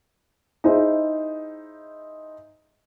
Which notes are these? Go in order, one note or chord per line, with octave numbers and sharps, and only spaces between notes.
D#4 E4 G#4 C5